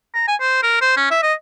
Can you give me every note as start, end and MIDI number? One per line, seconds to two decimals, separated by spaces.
0.15 0.24 82
0.28 0.35 80
0.40 0.60 72
0.63 0.80 70
0.81 0.93 72
0.97 1.09 61
1.11 1.23 76
1.23 1.34 75